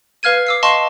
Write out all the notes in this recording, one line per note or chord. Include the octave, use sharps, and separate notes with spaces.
B4 F5 F6 G#6 D#7
D6 E6 C7
D#5 F5 A5 C6 C#6